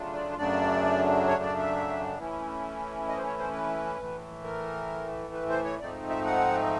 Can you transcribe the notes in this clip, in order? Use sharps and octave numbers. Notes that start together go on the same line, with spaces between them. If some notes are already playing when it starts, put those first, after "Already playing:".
Already playing: C#3 F#3 A3 D4 F4
D5
F#2 C#3 F#3 A3 D4 D5
C#5
D5
E5
E3 A3 C#4 E4
D#5
C5
C#5
C5
B4
A2 E3 A3
A#4
B4
C5
C#5
G#2 F3 A3 C4 D#4 D5
E5
F#5